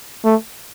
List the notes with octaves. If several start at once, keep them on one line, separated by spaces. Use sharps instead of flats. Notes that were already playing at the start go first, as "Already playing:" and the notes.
A3